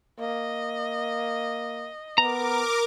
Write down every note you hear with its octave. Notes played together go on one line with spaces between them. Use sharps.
A#3 D#5
B3 A#4 A#5 D6